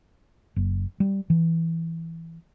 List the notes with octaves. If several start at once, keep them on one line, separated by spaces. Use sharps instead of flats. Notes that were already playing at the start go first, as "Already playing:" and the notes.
F#1
G3
E3